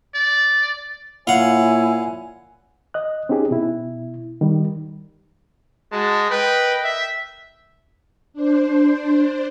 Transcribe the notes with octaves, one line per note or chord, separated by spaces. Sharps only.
D5
A#2 E4 C#5 F5 F#5 G#5
D#5 F#6
C4 C#4 D#4 G4 G#4
B2 E4
D#3 G3
G#3 F#4 F#5 A5
A#4 B4 D#5 G5
E5
D4 C5